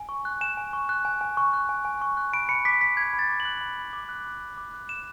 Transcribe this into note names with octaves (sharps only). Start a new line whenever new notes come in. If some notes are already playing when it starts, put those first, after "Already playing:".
Already playing: G#5
C#6
F#6
G#5 E7
G#5
C#6
F#6
G#5
G#5
C#6
F#6
G#5
G#5
C#6
F#6
B5 D7
B5 C#7
D6 B6
F#6 B6
B5 G#6
B5
A6
D6
F#7
F#6
B5
B5
D6
F#6
B5
B5
D6
F#6
F#6 E7